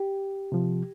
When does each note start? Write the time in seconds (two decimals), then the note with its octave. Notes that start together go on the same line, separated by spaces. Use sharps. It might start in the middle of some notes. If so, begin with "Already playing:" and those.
Already playing: G4
0.52 C3 F3